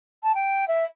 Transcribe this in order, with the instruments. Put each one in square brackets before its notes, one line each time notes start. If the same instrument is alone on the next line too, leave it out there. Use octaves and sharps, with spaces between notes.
[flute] A5
G5
E5